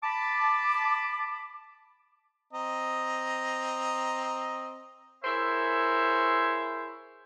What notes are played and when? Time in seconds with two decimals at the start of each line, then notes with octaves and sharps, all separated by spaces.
0.04 A5 B5 D6
2.53 C4 D#5 A#5
5.24 E4 G#4 A#4 C5 C#5 E5